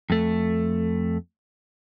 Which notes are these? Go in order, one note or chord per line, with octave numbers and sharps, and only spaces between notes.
F2 A3